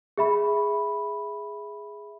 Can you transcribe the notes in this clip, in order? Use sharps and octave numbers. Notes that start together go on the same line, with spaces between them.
G#4 E5 B5